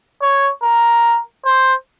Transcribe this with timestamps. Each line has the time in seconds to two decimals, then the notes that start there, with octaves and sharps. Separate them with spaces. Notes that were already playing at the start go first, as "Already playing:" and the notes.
0.22 C#5
0.63 A#4
1.45 C5